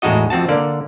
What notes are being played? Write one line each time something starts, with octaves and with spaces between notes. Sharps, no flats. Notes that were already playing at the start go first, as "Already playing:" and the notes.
E2 A2 G#3 D#4 F#4 D#5
F2 C4 F#4 A5
D3 A#3 D5